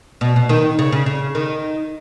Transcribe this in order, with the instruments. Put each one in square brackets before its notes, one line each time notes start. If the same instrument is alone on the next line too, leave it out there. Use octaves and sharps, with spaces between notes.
[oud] B2
B2
D#3
C#3
C#3
C#3
D#3